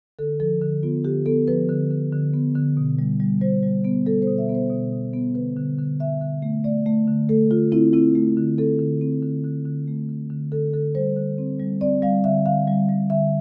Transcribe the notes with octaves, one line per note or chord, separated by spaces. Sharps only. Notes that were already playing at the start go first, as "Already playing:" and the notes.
D3 A4
F3 A4
D3
B3 F4
D3 G4
B3 A4
F3 B4
D3
D3
D3
B3
D3
B2
G3
G3
G3 C5
G3
B3
G3 A4
C5
B2
E5
B3
C5
B2
B2
B3
D3 B4
D3
D3
D3 E5
D3
A3
A3 D5
A3
D3
A3 A4
D3 F4
C4 E4
C4 E4
A3
D3
C4 A4
D3
C4
D3
D3
D3
A3
D3
D3
D3 A4
D3 A4
G3 C5
D3
C4
G3
C4 D5
G3 F5
D3 E5
D3 F5
G3
G3
D3 E5